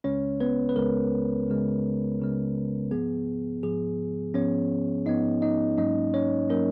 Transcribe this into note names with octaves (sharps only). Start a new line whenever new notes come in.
C#2 C#3 G#3 C#4 C#5
B3 B4
B4
C#2 C#3 G#3 A#4
C#2 C#3 G#3
C#2 C#3 G#3
G#2 F3 B3 G#4
G#2 F3 B3 G#4
G#2 F3 B3 C#4 C#5
G#2 F3 B3 D#4 D#5
D#4 D#5
G#2 F#3 A#3 C#4 D#4 D#5
C#4 C#5
F#3 A#3 C#4 A#4